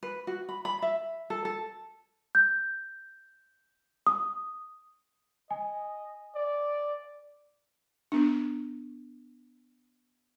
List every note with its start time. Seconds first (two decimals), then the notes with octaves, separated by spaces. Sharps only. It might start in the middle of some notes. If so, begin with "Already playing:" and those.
0.03 B4
0.27 F#4
0.49 B5
0.65 B5
0.82 E5
1.30 A4
1.45 A4
2.35 G6
4.07 D#6
5.51 D#5 G#5
6.36 D5
8.12 B3 D4